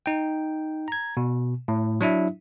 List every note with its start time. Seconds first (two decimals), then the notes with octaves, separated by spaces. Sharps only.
0.06 D#4 G5
0.88 A#5 G#6
1.17 B2
1.68 A2
2.01 F#3 D4 E4 E5